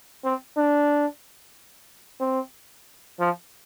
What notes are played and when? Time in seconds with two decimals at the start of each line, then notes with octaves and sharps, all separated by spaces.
0.24 C4
0.57 D4
2.20 C4
3.20 F3